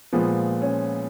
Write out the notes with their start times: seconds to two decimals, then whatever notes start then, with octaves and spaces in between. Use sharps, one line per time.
0.13 A#2 F3 G#3 B3
0.62 C#4